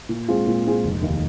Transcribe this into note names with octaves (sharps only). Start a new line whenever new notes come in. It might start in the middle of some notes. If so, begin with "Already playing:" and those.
A#2
G#3 C4 F4 G#4
A#2
G#3 C4 F4 G#4
F1
D#2 D#3